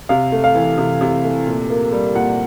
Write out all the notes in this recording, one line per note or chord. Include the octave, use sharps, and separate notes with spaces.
C3 F5
A3
F5
E3
C3
C3
A3
A#2
A#3
G3
A#2 F#5